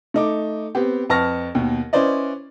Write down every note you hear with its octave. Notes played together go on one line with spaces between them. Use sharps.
A3 D#4 D6
B3 C4 G4
F2 B4 A5 C#6 F6 A#6
D#2 B2
C#4 E4 B4 C5 D5 D#5